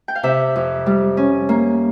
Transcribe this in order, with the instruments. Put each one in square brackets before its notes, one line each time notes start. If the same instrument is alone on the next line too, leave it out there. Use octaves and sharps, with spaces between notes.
[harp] G5
F5
C3 E5
F2
G3
C#4
A#3